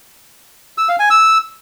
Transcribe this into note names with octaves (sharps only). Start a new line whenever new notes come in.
E6
F5
G#5
E6